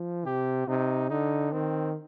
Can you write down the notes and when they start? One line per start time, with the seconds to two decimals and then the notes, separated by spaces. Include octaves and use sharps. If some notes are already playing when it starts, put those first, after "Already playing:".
Already playing: F3
0.26 C3 G4
0.68 C3 D#4
1.10 D3 D#4
1.52 D#3 C4